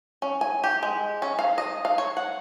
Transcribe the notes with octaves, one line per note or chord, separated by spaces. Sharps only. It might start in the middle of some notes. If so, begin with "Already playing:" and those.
C#4
G#5
G4
G#3
C#4
F5
D#5
F5
C#5
F#5